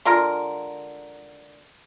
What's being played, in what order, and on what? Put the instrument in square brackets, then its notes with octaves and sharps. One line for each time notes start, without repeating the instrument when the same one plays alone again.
[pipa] D3 G#3 F4 A#4